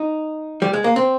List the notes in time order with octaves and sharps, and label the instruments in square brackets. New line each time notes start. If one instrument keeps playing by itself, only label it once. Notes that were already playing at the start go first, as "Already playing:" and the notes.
Already playing: [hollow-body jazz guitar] D#4
G3
G#3
A#3
C4